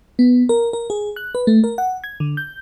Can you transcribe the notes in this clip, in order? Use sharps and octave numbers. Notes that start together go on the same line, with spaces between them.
B3
A#4
A#4
G#4
F#6
B4
A3
A#4
F#5
G#6
D3
G6